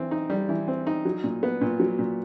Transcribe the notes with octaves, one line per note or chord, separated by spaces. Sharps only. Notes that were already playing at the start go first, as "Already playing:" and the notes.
Already playing: E3 C4
D#4
G3
E3
C4
D#4
F#3
A#2
B3
A#2
F#3
A#2